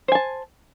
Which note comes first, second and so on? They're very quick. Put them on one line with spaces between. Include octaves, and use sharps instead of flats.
C5 G#5 A5